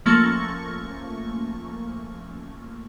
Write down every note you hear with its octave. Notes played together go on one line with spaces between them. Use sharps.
F3 A3 A#3 C#4 C#6